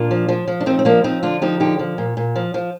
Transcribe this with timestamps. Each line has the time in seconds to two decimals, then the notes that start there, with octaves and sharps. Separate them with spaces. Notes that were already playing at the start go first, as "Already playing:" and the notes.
Already playing: A#2 D4 F4
0.11 F3
0.29 F3
0.48 F3
0.60 D4
0.66 F3 C4 D#4
0.79 C4
0.85 F3 A#3 D4
1.04 F3 C4 D#4
1.23 D3 D4 F4
1.42 F3 D#4 G4
1.60 D3 D#4 G4
1.79 F3
1.98 A#2
2.17 A#2
2.36 F3
2.54 F3